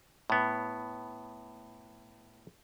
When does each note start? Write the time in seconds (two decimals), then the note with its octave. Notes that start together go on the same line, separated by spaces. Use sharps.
0.30 A2 B3